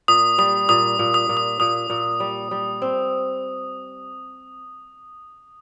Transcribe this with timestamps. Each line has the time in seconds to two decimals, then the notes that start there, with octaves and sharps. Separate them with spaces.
0.08 A#2 D#6
0.38 G3 D#6
0.69 A#2 D#6
0.99 A#2
1.14 D#6
1.29 A#2
1.37 D#6
1.60 A#2 D#6
1.90 A#2
2.20 G3
2.51 G3
2.82 C4